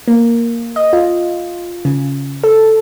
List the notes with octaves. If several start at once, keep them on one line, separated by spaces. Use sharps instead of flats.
A#3
D#5
F4
C#3
A4